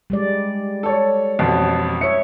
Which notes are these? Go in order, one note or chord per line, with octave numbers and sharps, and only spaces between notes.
G3 G#3 D5
A4 C#5
A1 F2 B2
C#5 E5 C#7